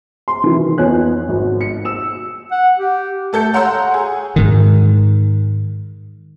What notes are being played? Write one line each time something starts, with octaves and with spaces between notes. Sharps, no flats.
C6
D#3 E3
F2 B3 C#5 G#5 F#6
G#1
C#7
E6 E7
F#5
G4
A3 A4 G6 C#7
C#5 F#5 A#5 C6 E6 G6
G#4
G#2 D#3